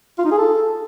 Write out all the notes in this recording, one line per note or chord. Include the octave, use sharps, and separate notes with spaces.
F4
D#4
G#4
A4